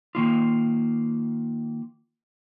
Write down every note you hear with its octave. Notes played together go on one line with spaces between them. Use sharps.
D#3 A#3 F4